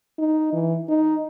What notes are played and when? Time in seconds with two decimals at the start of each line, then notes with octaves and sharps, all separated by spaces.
0.18 D#4
0.53 E3
0.89 D#4